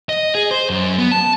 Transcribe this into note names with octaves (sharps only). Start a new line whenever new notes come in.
D#5
G#4
C5
F#2
B3
A5